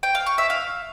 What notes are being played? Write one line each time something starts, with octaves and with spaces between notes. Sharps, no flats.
G5
F5
C#6
E5
F5